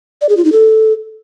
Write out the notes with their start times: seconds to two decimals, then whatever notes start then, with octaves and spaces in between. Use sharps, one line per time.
0.21 D5
0.29 G#4
0.37 F4
0.45 D#4
0.52 A4